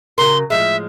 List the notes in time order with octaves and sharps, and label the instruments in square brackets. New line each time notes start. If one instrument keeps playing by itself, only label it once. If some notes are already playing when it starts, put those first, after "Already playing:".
[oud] C#3 F#3 A#4 [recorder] C6
[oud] A2 F3 G#3 [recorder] E5